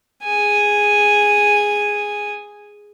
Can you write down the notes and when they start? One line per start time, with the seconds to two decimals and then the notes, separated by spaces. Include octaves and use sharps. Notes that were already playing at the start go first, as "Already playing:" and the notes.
0.23 G#4 G#5